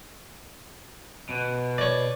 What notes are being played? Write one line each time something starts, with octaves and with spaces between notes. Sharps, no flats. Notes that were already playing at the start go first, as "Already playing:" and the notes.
B2
C#5 D5